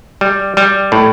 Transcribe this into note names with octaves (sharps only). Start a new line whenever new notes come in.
G3
G3
A2